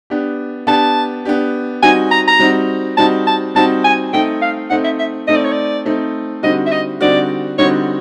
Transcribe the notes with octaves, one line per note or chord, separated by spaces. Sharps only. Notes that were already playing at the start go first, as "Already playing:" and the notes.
B3 D4 G4
B3 D4 G4 A5
B3 D4 G4
G3 C4 D#4 F#4 G#5
A#5
A#5
G3 C4 D#4 F#4
G3 C4 D#4 F#4 A5
A5
G3 C4 D#4 F#4 A5
G#5
A3 C4 D#4 G5
F5
A3 C4 D#4 F#5
E5
E5
A3 C4 D#4 D#5
D5
C#5
D5
A3 C4 D#4
D3 G3 C4 D#4 F#4 D#5
E5
D#5
D3 G3 C4 D#4 F#4 D5
D3 G3 C4 D#4 F#4 C#5